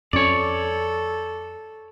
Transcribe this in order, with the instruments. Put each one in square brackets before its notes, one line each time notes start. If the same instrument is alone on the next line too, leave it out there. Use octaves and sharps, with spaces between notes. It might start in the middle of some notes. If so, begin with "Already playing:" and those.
[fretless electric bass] F2 C#4 [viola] A4 [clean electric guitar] C#5 D5